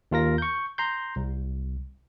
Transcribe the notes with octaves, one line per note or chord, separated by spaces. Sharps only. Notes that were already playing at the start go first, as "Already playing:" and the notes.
D#2 F4 A#4 A#6
C#6 G6
A#5 C6 G6
C2